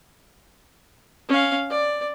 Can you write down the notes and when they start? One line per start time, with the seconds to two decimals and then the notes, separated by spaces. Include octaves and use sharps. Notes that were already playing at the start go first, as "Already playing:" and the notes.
1.28 C#4 F5
1.70 D5